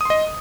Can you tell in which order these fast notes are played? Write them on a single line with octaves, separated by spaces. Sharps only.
D#6 C6 D#5